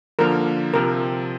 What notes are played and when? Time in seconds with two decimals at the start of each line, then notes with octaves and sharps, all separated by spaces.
0.19 D3 F3 A#3 A#4
0.74 C3 F3 C4 A#4